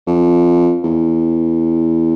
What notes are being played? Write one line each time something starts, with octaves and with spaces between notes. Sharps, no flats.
F2
E2